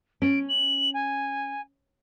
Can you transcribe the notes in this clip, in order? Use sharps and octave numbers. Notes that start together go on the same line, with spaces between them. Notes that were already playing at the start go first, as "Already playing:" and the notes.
C#4 D7
F#7
G#5